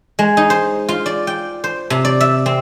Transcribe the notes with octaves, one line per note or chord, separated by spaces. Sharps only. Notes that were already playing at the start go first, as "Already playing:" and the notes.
G#3
D#4
C5
F4
D5
G5
C5
C3
D5
E5
C4